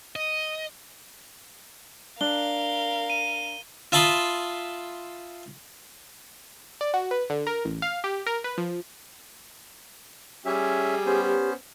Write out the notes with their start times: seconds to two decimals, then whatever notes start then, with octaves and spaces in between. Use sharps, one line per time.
0.16 D#5
2.21 D4 A#4 F5 G7
3.10 D#7
3.92 F4 E5 A5 B5 C6 D#6
6.81 D5
6.94 F#4
7.11 B4
7.30 D3
7.47 A#4
7.65 A1
7.82 F5
8.04 G4
8.26 A#4
8.44 B4
8.58 F3
10.46 G3 C#4 G#4 E5
11.06 B3 C#4 G4 C5